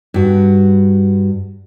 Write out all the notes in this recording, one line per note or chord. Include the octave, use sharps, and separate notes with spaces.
G2 F#4